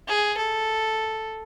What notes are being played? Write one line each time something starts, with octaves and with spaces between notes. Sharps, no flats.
G#4
A4